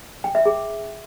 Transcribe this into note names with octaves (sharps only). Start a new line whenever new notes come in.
G5
E5
G#4